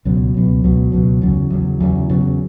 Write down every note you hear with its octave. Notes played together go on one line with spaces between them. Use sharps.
C#2 B2 F#3
C#2 B2 F#3
C#2 B2 F#3
C#2 B2 F#3
E2 C#3 F#3
E2 C#3 F#3
E2 C#3 F#3
E2 C#3 F#3